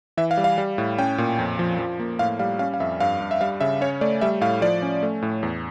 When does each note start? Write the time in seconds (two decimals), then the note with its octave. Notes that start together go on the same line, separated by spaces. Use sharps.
0.17 E3 E5
0.31 F5
0.37 G3
0.44 F5
0.58 G3
0.78 A2
0.98 C#4 G5
1.18 A#2
1.39 F2
1.59 F3
1.79 F3
2.00 A#3
2.19 A2 F5
2.39 G3 F5
2.59 C#4 F5
2.74 F5
2.80 F2 E5
3.00 G2 F5
3.21 G2
3.31 E5
3.41 G3 F5
3.61 C#3 E5
3.81 C#4 C#5
4.01 A3 D5
4.21 G3 E5
4.41 A2 F5
4.62 F3 D5
4.82 C#4
5.03 A3
5.22 A2
5.43 E2